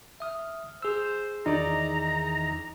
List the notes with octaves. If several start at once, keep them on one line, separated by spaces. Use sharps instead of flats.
E5 D#6 F6
G#4 C5 E6
E2 D#3 D#4 D5 A#5